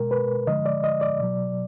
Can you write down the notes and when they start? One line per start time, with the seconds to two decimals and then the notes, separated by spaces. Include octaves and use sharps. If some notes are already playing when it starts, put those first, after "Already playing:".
Already playing: B2 G#3 A#4
0.11 B4
0.47 D3 F3 G#3 D#5
0.66 D5
0.84 D#5
1.01 D5
1.20 B2 F#3